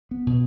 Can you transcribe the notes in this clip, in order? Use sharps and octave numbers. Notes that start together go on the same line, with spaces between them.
B3
B2